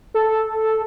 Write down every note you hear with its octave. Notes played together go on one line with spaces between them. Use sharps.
A4